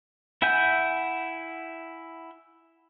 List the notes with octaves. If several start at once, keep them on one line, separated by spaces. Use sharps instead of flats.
E4 E5 F#5 G#5 G6